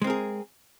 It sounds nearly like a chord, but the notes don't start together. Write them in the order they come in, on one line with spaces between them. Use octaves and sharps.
G#3 C4 A#4 G#4